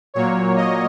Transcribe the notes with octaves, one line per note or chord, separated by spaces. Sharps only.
A#2 F#3 A#3 C#5
D#5